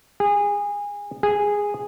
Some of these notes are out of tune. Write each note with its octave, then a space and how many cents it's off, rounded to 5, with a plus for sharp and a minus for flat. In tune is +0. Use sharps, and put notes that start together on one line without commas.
G#4 -25
G#4 -10